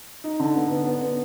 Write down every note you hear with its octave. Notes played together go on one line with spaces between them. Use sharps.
D#4
D3
B3
B3
B3
B3